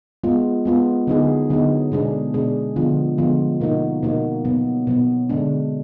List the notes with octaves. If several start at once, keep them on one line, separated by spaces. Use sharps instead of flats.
G#3 B3 F4
G#3 B3 F4
D3 F#3 B3 D#4 G#4
D3 F#3 B3 D#4 G#4
B2 G#3 D4 G#4
B2 G#3 D4 G#4
D3 F3 G#3 B3 F4
D3 F3 G#3 B3 F4
B2 A#3 D#4 F#4
B2 A#3 D#4 F#4
B2 F#3 B3
B2 F#3 B3
D3 G#3 D4